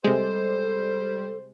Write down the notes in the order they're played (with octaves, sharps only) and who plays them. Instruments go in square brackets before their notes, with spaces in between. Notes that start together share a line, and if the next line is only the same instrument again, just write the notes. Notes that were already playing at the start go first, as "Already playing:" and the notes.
[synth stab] C3 G#3 [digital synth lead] G3 [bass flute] A4 [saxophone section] C5